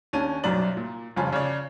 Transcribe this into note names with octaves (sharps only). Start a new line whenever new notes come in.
D#2 C#4 D4 D#7
B1 F#2 C3 G3 D5 F#7
A#2
G1 F2 C#3 F4 G#5
C#3 C#5 D5